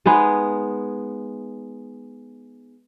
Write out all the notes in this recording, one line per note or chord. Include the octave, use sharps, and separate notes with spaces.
G#3 B3 D#4 G#4